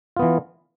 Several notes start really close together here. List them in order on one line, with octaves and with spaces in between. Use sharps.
F4 B3 E3